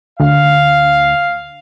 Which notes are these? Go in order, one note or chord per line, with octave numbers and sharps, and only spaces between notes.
D2 F5